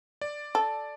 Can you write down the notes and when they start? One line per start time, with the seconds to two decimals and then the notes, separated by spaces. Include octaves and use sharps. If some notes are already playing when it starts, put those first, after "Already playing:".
0.21 D5
0.55 A4